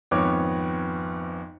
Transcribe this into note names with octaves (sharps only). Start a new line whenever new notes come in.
G#1 F2 B3 C#5 D6